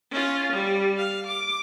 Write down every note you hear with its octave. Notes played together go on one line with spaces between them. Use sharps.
C#4 F4
G3
F5
D6